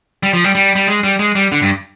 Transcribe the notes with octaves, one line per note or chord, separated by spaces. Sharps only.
G3
F3
G3
G3
G3
G#3
G3
G#3
G3
D3
G2